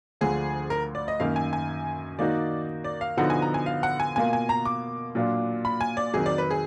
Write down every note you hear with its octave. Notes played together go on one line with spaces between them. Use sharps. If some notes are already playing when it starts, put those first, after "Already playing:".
D2 D3 F3 G#4
A#4
D5
D#5
F#2 D#3 A#3 F5
G#5
G#5
D#3 A#3 D#4 F#4 D5
D5
F5
D3 F3 B3 D#4 F#4 F#5
G#5
A#5
G#5
F5
F#5
G#5
B2 A#3 F4 G#5
G#5
A#5
D6
A#2 F#3 D4 F4
B5
G#5
D5
F2 D#3 F#3 G#4
D5
B4
G#4